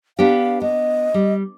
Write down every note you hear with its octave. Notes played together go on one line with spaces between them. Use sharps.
B3 D4 G4 F5
B3 D#5
G3